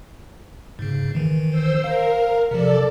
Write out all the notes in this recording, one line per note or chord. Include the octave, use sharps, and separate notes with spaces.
G#2 C#3
D#3 E3
C5 E6
A#4 F5
C3 F3 A4 D5